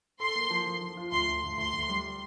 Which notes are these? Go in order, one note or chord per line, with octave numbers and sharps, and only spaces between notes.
A4 C6
A#3
F3
F3
F3
F4
D2 C6
D2
D2
D2 C6
D2
G3